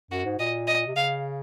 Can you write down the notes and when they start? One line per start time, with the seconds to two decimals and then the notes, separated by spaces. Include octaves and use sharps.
0.11 F#2 F#4
0.25 G#2
0.39 A#2 D#5
0.67 D#5
0.87 C3
0.95 C#3 F5